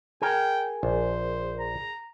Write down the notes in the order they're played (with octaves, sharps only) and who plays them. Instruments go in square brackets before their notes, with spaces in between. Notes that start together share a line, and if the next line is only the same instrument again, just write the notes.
[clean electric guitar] G#4 A#4 [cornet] G5
[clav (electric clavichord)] A#1 [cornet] C5
[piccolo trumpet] A#5